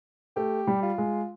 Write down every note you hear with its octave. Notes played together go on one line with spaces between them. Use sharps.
A3 G4
G3
F4
G#3